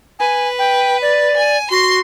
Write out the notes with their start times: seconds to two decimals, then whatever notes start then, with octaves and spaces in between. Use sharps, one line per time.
0.19 B4 G#5
0.59 G5
1.02 D5
1.36 G#5
1.71 F#4 C6